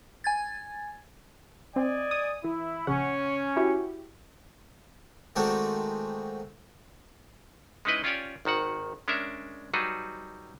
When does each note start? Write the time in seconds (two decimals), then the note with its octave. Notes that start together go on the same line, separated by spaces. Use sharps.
0.24 G#5 G#6 A6
1.76 C4 D5 D#5 G#5
2.11 D#6
2.44 E3 E4
2.87 A#1 C#3 C#4 F#5
3.56 E4 F#4 G4
5.36 D#3 G#3 A3 C4 D4 F#4
7.85 G#3 C#4 D#4 E4 B4 D#5
8.04 C#4 F4 G4 C#5 D5 G#5
8.45 G#1 D#3 F#4 F#5
9.08 G#3 C#4 D4 A#4 E5
9.74 F#3 G3 D#4 F#4 G#4 B4